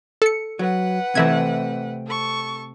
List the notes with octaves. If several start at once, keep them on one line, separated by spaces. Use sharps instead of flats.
A4 C#7
F#3 B4 F#5
C3 E3 A3 C4 E5 G#6
A4 C#6